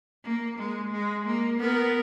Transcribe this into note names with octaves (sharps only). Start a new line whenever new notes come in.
A#3
G#3
G#3
A#3
B3 A#4